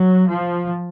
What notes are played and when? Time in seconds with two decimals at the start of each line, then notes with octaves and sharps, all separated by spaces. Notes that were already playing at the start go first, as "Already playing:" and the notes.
Already playing: F#3
0.27 F3